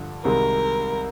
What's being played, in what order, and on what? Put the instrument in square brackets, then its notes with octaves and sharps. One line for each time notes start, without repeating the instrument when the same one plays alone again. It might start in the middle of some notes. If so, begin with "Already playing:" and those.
Already playing: [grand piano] G2 D3 F3
[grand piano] C2 C3 D#3 G#3 [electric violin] A#4